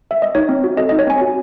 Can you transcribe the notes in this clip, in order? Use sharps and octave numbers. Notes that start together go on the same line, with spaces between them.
E5
D#5
D#4 C#5
C4
F#4
A4 D#5
D#4 D#5
C#5
C4 G#5
F#4